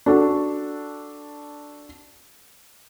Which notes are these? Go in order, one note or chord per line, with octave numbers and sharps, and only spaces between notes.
D4 F#4 A4